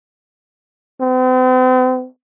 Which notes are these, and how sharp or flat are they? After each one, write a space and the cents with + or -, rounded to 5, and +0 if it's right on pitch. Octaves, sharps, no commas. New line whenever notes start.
C4 -45